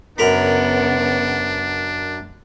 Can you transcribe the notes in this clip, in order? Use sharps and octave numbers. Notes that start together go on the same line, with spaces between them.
F#2 C#3 B3 D4 A#4 B5